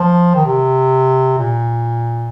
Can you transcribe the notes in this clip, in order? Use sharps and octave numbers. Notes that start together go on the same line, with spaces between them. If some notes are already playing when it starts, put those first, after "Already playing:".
Already playing: F3
D#3
C3
A#2